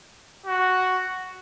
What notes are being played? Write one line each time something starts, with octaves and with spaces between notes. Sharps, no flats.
F#4